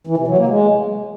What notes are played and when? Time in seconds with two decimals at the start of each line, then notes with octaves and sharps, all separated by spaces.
0.07 E3
0.17 C3
0.28 F#3
0.38 A#3
0.48 G#3